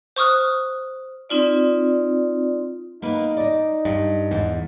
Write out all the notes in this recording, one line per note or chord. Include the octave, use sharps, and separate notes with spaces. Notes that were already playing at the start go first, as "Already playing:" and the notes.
C5 C#6 D#6 F6 F#6
C4 D#4 F4 D5
A#3 B3 D#4 B4
D5 D#5
G2
E2 G#2